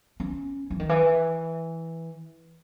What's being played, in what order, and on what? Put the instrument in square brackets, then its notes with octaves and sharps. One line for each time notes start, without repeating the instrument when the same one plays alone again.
[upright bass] C#4
E3
D#3
E3